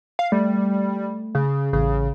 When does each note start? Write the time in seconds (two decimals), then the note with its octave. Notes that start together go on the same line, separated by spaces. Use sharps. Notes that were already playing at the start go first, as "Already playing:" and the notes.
0.19 F5
0.32 G3 A3
1.35 C#3
1.73 A1 C#3